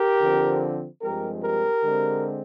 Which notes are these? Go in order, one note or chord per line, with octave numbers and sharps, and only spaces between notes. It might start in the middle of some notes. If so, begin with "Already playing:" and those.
Already playing: G4 A#4
D3 F3 C4
G2 F3 G#3 C4 G4 A#4
G4 A#4
D3 G#3 C4